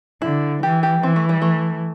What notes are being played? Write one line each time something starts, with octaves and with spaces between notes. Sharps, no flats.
D3 E4
E3 G4
G4
E3 C4
A3
G3
A3